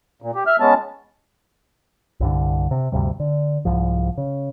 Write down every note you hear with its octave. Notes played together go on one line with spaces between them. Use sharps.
A#2
G4
E5 F6
G#3 B3 C#4 A5
C2 G2 D3
C3
D2 G2 C3 G3
D3
C2 G#2 F3
C#3